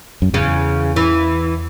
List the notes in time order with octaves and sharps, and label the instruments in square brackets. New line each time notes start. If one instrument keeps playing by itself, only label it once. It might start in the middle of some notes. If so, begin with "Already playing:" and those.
[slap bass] F#2
[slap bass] E2 [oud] C#3
[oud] E3